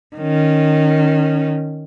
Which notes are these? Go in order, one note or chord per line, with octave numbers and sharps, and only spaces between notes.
D#3 C#4